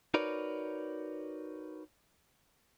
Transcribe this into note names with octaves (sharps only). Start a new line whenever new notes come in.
D#4 F#4 A#4 B4 C#5 D5